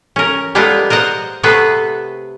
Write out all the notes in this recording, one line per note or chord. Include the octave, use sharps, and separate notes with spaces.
C#4 A#4
G3 G#3 B3 F4 A4 A#4
A#4 C5 D#5 F#5
C3 A3 B3 G#4 A4 B4